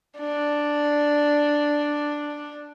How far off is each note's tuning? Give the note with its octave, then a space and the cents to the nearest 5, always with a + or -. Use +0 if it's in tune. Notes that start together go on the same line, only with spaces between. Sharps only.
D4 +0